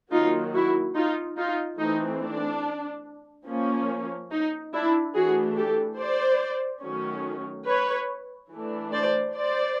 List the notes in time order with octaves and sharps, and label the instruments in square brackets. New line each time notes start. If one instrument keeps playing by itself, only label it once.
[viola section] D#3 F#3 A#3 D#4 F4
E4 F#4
D#4 F4
D#4 F4
E3 A3 C4 D#4
D4
F3 A#3 C#4
D#4
D4 E4
E3 A3 D4 F#4 G#4
G4 A4
C5 D5
D#3 F#3 A3 C#4
B4 C#5
E3 A3 D4
C5 D5
C5 D5